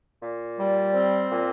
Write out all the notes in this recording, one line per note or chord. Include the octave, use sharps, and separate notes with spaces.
A#2
G3
C4
A#2